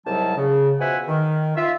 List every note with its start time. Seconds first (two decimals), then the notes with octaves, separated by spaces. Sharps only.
0.06 C2 G#2 F#3 G3 A5
0.37 C#3
0.80 B2 F3 C5 E5 F#5 G#5
1.08 D#3
1.56 F4 E5